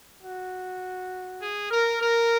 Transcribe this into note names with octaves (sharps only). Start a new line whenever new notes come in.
F#4
G#4
A#4
A#4